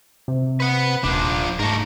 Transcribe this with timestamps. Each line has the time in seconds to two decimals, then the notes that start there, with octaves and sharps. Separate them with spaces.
0.28 C3
0.60 B4 F#5
1.04 D#1 F3 D4
1.59 G#2 A3 A#4